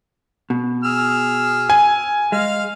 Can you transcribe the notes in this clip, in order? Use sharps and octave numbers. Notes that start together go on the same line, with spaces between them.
B2
G#4 E6 F6
G#5
G#3 F5 F6